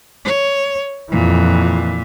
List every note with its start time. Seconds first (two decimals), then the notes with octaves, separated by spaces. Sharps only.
0.25 C#5
1.12 F2 A#2 E3